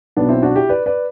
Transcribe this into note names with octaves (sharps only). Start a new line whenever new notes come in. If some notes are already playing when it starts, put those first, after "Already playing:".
B1 B2 B3 D4
C4 E4
D4 F#4
E4 G4
B4 D5
B4 D5